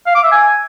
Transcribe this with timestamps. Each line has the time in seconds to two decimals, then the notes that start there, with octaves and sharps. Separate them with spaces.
0.07 F5
0.15 D6
0.23 E5
0.32 G#5